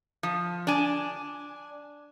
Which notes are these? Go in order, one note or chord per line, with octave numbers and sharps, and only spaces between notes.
F3
D4 G#5